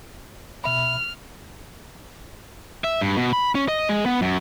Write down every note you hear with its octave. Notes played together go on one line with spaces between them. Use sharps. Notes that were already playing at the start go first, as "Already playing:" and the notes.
B2 E5 B5 F6
E5
G2
B2
B5
C#4
D#5
G#3
B3
F#2